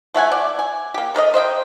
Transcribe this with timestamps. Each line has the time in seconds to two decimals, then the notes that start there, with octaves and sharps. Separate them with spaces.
0.14 F3 A3 F#5 G#5
0.32 D5
0.59 G#5
0.94 A#3 G4
1.14 A4 A#4 D5 D#5
1.34 C5 D#5 E5 G5